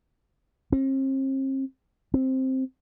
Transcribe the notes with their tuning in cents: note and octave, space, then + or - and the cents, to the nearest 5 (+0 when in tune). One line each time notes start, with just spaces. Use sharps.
C4 +40
C4 +5